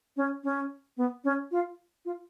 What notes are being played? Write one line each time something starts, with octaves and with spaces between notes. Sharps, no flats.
C#4
C#4
B3
C#4
F4
F4